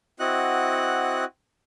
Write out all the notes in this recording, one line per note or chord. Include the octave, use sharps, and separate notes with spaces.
C4 E4 F#4 D#5 F#5 F#6